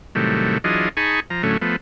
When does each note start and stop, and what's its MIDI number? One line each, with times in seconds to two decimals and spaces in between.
0.15 0.58 45
0.15 0.58 48
0.15 0.58 51
0.15 0.58 54
0.15 0.58 55
0.15 0.58 57
0.64 0.89 52
0.64 0.89 54
0.64 0.89 62
0.64 0.89 65
0.64 0.89 68
0.64 0.89 75
0.97 1.20 63
0.97 1.20 68
0.97 1.20 80
0.97 1.20 81
0.97 1.20 83
0.97 1.20 85
1.30 1.42 53
1.30 1.42 82
1.43 1.57 45
1.43 1.57 50
1.43 1.57 54
1.43 1.57 57
1.43 1.57 61
1.61 1.76 53
1.61 1.76 57
1.61 1.76 59